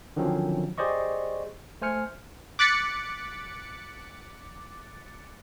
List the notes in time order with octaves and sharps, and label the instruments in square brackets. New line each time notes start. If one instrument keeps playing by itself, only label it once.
[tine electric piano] D3 D#3 F3 F#3 C4 C#4
G4 G#4 C5 D5 D#5 C#6
A3 C5 G#5 F6 C#7
[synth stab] D6 F#6 A6 B6 C#7